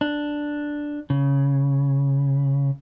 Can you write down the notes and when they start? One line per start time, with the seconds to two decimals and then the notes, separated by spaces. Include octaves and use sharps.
0.01 D4
1.10 C#3